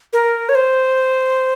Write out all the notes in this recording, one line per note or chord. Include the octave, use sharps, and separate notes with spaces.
A#4
C#5
C5